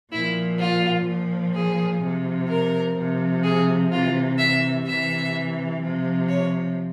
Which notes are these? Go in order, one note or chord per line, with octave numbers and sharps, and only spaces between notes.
A#2 F3 E4
F4
A#2 F3
G#4
C3 F3
A#4
C3 F3
G#4
C3 E3 F4
E5
C3 E3 E5
C3 F3
C#5